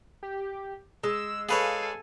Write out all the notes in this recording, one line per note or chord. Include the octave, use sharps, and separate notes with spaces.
G4
G#3 E6
G#4 A4 B4 C#5 F5 G#5